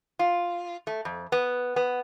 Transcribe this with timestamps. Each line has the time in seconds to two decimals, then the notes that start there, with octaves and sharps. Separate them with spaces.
0.19 F4
0.87 A3
1.05 F2
1.32 B3
1.76 B3